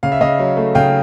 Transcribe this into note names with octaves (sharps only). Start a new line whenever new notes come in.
C#3 F5
E5
C#3 D#5 F5
F#3
A3
C#3 F5 G5